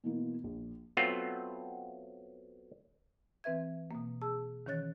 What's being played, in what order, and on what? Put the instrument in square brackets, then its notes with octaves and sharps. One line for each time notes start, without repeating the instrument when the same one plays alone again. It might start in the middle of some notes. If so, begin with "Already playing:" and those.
[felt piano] B2 E3 A#3
A#1
[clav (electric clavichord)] F#3 A3 B3 C4 F4
[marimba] E3 C4 B4 E5 G#6
B2 A#3
G#4 A5 E6
D#3 E3 C#4 C#5 F#6 A6